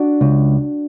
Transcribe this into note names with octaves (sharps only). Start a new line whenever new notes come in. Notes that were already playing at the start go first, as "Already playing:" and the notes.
Already playing: D4 F#4
C#2